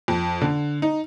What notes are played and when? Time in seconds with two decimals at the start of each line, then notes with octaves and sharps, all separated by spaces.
0.08 F2
0.42 D3
0.82 D#4